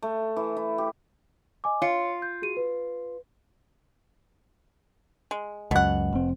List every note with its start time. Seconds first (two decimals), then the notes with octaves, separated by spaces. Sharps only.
0.02 A3
0.36 E3
0.57 E4
0.78 G4
1.64 D#5 G#5 D6
1.82 F4 C#5 C#7
2.22 G6
2.42 F#4 G#4 D#7
2.57 B4
5.31 G#3
5.71 C#2 F#2 B2 F#5
6.12 F1 C4